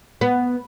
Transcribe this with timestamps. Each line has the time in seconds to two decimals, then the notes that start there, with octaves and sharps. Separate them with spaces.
0.21 B3